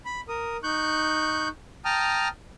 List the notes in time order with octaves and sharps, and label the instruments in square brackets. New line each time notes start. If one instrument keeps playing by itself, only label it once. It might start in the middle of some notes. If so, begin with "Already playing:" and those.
[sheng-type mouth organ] B5
A#4 D#6
D#4 C#6 F#6 G6
G5 A5 A#5 D#6 F6